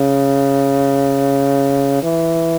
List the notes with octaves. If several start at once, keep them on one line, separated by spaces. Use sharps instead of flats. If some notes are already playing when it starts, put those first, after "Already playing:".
Already playing: C#3
E3